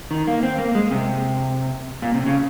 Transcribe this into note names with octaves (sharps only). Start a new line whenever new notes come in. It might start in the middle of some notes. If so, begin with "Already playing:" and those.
D#3
A#3
C4
A#3
G#3
C3
A#2
C3
C#3